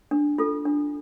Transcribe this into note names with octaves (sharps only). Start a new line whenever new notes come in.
D4
F4 A4
D4